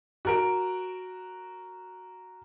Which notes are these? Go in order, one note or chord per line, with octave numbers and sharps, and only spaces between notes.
F#4 A#4 D7